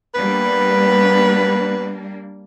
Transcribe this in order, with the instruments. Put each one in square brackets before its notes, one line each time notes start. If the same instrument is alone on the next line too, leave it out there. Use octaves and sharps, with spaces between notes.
[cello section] G3 A#3 D4 [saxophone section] B3 B4